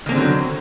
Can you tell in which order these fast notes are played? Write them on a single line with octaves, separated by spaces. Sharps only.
D#3 A#3 C4 D3 F#3